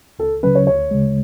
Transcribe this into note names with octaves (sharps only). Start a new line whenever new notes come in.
C#2 A4
C#3 F#3 C#4 B4
C#5
D2 C#5
C#3 G#3